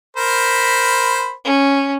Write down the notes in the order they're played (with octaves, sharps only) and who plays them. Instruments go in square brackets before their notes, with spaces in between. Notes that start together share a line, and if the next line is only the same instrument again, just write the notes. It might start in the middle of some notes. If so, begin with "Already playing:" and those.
[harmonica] A#4 C5 B5
[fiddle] C#4